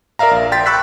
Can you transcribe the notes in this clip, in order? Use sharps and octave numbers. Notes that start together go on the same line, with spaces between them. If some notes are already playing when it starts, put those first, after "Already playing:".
A#4 D5 E5 F5 A#5
A#1
G5 C6 A6 B6
G5 B5 C#6 E6 F#6 B6